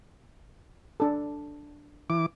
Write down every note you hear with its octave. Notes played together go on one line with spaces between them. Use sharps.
D4 A4
E3 D6